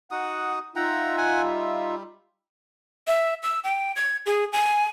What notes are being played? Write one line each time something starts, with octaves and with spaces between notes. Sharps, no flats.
D#4 F#4 F#5 D#6
D#4 F4 E5 F#5 G5 A#5
F#5 G#5
G3
E5
E6
G5
G#6
G#4
G#5